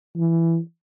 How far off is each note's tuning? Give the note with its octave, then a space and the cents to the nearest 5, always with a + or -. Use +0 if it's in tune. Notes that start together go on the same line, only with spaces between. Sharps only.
E3 +10